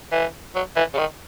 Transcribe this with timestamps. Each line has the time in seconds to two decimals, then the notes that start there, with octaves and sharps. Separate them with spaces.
0.12 E3
0.55 F#3
0.76 E3
0.94 C#3
0.98 D#3